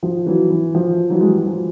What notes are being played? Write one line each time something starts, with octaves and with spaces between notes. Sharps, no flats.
F3
E3 F#3
E3
F3
E3 F#3
G#3
G3
F#3
F3